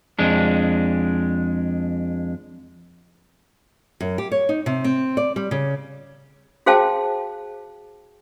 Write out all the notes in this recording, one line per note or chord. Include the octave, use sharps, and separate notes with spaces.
F2 G#3 D4
F#2
G4
C#5
D#4
C3
C4
D5
G3
C#3
F#4 G#4 C5 F5 G5 A5